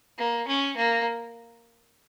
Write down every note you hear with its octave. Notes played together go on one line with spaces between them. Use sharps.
A#3
C#4
A#3